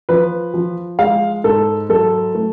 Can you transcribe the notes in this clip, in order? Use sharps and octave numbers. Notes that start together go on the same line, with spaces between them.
F3 B4
F3
G#3 F5
G#2 A4
F#3 A4
A3